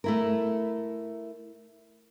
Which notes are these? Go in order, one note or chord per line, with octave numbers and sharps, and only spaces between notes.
A3 E4 A#4